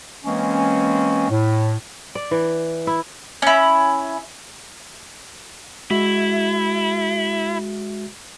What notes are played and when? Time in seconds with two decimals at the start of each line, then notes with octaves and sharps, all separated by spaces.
0.25 E3 G#3 A#3 C4 C#4
1.30 A2
2.15 D5
2.31 E3
2.87 E4
3.42 C#4 E4
5.91 G#3 E4 F#4 E5